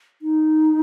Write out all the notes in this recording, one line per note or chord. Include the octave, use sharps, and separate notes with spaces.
D#4